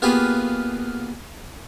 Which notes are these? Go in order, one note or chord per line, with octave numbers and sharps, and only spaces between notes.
A#3 B3 F4 G4 G#4 B4